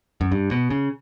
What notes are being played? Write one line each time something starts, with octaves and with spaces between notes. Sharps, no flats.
F#2
G2
B2
C#3